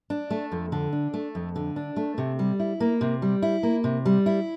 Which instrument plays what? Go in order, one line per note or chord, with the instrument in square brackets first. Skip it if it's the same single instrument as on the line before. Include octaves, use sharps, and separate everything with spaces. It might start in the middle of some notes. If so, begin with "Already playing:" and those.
[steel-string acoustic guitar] D4
A3
F2
D3
D4
A3
F2
D3
D4
A3
C3
G3
E4
A#3
C3
G3
E4
A#3
C3
G3
E4